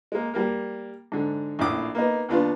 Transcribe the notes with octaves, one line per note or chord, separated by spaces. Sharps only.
G#3 A#3
G3 A#3 A#4
G#2 D3
A#1 A2 C#4 B5 D6 D#6
A#3 B3 D#4
D#2 B3 D4 F4